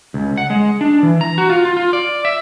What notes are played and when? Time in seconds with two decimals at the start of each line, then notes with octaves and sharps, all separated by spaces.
0.14 C#2
0.37 F#5
0.50 G#3
0.81 D4
1.03 E3
1.21 A#5
1.38 F#4
1.50 F4
1.65 F4
1.77 F4
1.93 D5
2.25 E5